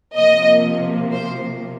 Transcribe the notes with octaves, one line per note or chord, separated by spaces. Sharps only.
C3 F3 A#3 D#5
C5